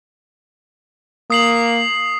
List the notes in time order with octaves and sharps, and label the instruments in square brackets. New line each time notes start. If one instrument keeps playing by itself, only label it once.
[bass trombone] A#3 [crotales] D#6 C7 F#7